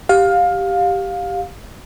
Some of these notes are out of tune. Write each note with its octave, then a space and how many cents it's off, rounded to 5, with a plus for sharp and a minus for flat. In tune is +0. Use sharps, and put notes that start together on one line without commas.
G4 +0 F5 +20